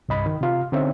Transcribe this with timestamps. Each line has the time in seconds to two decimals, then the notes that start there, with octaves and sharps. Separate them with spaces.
0.09 C2 G2 D#5 B5
0.26 D#3
0.41 C3 F4 F5
0.72 D3 C4 C#4 D#4 E5